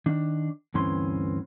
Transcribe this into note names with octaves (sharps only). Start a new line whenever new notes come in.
D#3 D4
D2 G2 E3 C4 C#4 C6